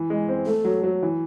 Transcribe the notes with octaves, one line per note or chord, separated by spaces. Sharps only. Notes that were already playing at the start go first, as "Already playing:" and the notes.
Already playing: E3
G#3
C4
A3 A4
F#3
F#3
E3